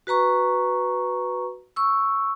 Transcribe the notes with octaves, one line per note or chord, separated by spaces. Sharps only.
F#4 B4 A#5 C#6
C#6 E6